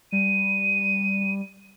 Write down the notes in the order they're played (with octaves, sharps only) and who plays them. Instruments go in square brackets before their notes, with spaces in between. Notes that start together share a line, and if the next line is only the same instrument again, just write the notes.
[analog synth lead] G3 [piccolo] D#7